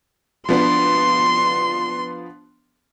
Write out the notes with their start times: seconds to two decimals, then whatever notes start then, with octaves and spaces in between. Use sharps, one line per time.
0.49 F3 B3 D4 C6